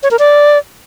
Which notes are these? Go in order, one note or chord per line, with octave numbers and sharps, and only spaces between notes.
C#5
A#4
D5